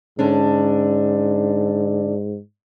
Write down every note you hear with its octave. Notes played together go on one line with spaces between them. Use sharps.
G#2 D3 C#4 D4